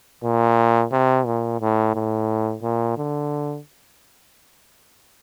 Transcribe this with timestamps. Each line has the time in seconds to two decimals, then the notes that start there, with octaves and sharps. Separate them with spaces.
0.23 A#2
0.92 C3
1.26 A#2
1.61 A2
1.95 A2
2.63 A#2
2.98 D3